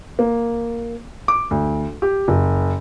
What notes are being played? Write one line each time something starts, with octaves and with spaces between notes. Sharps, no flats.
A#3
D6
D2
G4
F#1